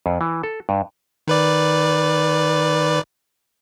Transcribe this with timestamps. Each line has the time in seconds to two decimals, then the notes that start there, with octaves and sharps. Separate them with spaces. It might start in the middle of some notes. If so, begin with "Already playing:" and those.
0.06 F2
0.21 E3
0.43 A4
0.69 G2
1.28 D#3 B4 D5